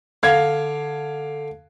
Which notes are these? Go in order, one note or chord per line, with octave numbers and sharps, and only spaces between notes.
D3 F5 G#6